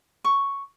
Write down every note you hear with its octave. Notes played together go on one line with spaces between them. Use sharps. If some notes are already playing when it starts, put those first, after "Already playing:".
C#6